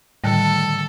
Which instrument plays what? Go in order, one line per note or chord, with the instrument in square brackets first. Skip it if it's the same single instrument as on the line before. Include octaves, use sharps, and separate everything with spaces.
[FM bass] A2 [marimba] D3 D#3 G3 [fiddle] A4